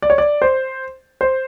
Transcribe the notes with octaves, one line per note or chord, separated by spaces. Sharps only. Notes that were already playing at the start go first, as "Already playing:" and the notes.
D5
C#5
D5
C5
C5